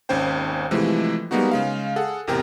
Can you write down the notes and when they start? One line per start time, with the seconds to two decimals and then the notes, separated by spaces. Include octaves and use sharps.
0.09 G#1 D#2 C#4 C5 G5
0.71 C3 E3 F3 G#3 A3
1.31 G3 G#3 A#3 B3 D#4 F#4
1.51 C#3 G#3 F5
1.96 G#4 A4 F#5
2.27 A1 E2 C3 A#4 G5